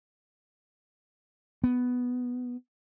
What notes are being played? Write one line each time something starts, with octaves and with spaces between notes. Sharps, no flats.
B3